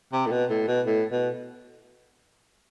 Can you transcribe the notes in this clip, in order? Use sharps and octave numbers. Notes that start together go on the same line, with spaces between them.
C3
A2
B2
A2
B2
A2
B2